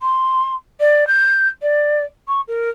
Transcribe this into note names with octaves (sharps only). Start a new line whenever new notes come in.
C6
D5
G6
D5
C#6
A#4